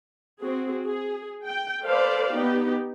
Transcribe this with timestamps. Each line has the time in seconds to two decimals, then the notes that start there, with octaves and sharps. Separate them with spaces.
0.39 C4 F#4 G#4
0.85 G#4
1.46 G5
1.84 A4 B4 C5 D5 F5
2.32 B3 D#4 G4